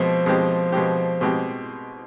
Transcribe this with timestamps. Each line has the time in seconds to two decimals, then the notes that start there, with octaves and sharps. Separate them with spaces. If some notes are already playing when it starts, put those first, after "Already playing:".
Already playing: B2 F3 G#3 C4
0.26 B2 G#3 C4 G4
0.72 B2 G#3 C4 G4
1.21 B2 G#3 C4 G4